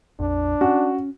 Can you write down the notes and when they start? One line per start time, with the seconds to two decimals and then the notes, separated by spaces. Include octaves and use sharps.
0.20 A#1 F2 D4
0.61 C#4 F#4